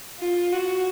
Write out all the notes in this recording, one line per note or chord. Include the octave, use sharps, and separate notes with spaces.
F4
F#4